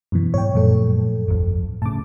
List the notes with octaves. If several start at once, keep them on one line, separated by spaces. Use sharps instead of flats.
F#2 B2 E3
G#2 C#5 G5
F#2 A#2 F3 A3 A4
D1 G1 F2
A2 C#3 A5 D6